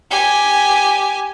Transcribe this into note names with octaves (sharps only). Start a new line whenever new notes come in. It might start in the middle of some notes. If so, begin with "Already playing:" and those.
G4 G#5